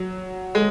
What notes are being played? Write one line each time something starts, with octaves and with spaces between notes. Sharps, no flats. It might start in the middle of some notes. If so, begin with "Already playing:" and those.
Already playing: F#3
G#3